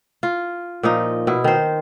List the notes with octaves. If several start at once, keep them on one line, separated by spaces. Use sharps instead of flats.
F4
A#2 F3 D#4
B2 E4
D#3 C5